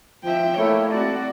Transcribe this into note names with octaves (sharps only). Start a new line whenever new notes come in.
F3 E5 G5
A3 A#3 E4 C#5
C4 F#4 D5